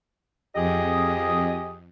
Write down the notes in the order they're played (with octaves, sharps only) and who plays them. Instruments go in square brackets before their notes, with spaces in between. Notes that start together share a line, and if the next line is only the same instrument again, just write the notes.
[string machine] F2 [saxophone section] G4 G#4 D#5